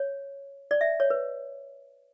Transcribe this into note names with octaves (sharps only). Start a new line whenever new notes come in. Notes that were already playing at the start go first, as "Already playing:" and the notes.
Already playing: C#5
D5
E5
C#5
B4